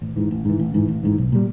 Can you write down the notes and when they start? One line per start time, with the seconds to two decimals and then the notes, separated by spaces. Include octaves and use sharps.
0.02 A1
0.16 G#2 E3
0.31 A1
0.45 G#2 E3
0.59 A1
0.74 G#2 E3
0.88 A1
1.03 G#2 E3
1.18 B1
1.32 A#2 G3